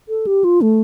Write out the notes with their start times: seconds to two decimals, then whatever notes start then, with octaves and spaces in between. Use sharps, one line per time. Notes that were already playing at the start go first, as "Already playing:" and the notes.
0.09 A4
0.27 G4
0.44 F4
0.62 A3